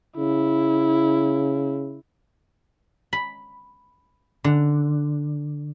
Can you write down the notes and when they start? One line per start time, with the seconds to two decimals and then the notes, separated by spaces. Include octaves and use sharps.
0.17 C#3 E4
3.13 B5
4.44 D3